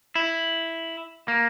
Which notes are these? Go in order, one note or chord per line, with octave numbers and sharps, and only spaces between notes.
E4
A#3